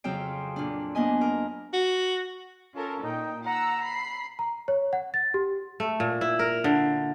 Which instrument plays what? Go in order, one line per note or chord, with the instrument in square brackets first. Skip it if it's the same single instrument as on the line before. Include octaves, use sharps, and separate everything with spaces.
[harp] F2 C#3 F#3 C4 F5 G5
A#2 D4
A#3 B3 D4 D#5 G#5
A#4
[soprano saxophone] F#4
[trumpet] C#4 [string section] F4 A4 A#4
[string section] A#2 G5 [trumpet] D#4
[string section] F#5 E6 [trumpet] A#5
[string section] B5 C7
[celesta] A#5
C#5
F#5
A6
G4
[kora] A3
A#2
E4
A#4
D3